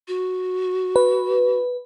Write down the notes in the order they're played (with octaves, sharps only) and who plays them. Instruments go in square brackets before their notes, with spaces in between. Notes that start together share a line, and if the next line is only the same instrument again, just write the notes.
[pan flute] F#4
[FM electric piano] B4